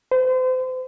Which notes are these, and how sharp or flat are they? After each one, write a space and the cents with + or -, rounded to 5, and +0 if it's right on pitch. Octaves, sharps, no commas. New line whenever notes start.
C5 -35